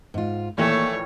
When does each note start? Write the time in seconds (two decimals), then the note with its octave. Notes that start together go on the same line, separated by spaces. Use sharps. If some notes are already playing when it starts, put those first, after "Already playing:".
0.14 G#2 F4
0.58 A#1 D#3 E3 A3 A#3 C#5